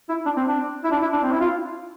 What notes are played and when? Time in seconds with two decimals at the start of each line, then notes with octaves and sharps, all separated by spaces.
0.09 E4
0.26 D4
0.37 C4
0.47 D4
0.84 E4
0.91 D4
1.02 E4
1.13 D4
1.23 C4
1.31 E4
1.40 F4